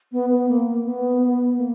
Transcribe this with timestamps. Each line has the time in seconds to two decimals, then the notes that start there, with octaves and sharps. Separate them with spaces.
0.12 B3
0.30 B3
0.49 A#3
0.67 A#3
0.85 B3
1.22 B3
1.57 A#3